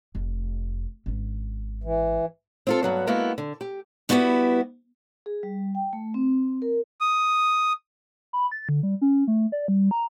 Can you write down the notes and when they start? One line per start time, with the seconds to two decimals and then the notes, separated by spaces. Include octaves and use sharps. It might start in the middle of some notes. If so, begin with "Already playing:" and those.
0.15 F1
1.06 G#1 C#4
1.84 E3
2.67 C4 F4 A4
2.83 G2 F#3 B3
3.07 G#3 A#3 B3 E4 F#4 A4
3.38 D3
3.61 G4
4.09 G3 B3 E4 F#4 G4 B4
5.26 G#4
5.43 G3
5.75 G5
5.93 A3
6.14 C4
6.62 A#4
7.01 D#6
8.33 B5
8.52 A6
8.69 D3
8.83 G3
9.02 C#4
9.28 A3
9.52 D5
9.68 G3
9.91 A#5